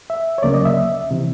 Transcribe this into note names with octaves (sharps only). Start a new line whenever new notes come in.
E5
C#5
D2 C#3 F#3 A#3 C#4 D5
D#5
E5
C3 E3